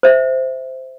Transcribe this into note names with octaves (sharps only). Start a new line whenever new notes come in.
C5 E5